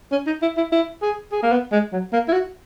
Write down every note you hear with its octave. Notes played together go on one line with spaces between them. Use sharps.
C#4
D#4
E4
E4
E4
G#4
G#4
A#3
B3
G#3
F#3
A#3
E4
F#4